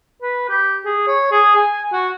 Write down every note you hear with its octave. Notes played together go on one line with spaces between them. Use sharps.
B4
G4
G#4
C#5
G#4
G#5
F#4